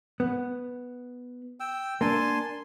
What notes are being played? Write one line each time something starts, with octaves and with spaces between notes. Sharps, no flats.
B3
G5 E6
A#3 D4 G#5 A5 C6